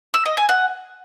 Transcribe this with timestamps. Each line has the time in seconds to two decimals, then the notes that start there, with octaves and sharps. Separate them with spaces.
0.14 E6
0.26 D#5
0.37 G#5
0.49 F#5